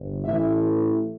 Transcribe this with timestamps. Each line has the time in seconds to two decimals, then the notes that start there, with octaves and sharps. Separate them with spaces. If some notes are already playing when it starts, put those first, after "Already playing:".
Already playing: G1
0.25 A1 A2 E3 A3 E5